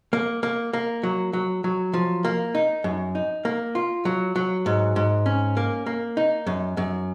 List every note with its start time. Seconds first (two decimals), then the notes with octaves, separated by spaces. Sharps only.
0.13 A#3
0.43 A#3
0.73 A#3
1.03 F#3
1.33 F#3
1.64 F#3
1.94 F3
2.25 A#3
2.55 D#4
2.84 F#2
3.15 D#4
3.45 A#3
3.75 F4
4.05 F#3
4.36 F#3
4.66 G#2
4.96 G#2
5.26 C#4
5.57 A#3
5.86 A#3
6.17 D#4
6.47 F#2
6.77 F#2